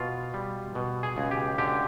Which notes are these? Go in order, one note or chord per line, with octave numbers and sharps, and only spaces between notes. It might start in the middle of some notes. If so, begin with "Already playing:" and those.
Already playing: B2 F4
G3
B2
G#4
C#2
G4
D3 G4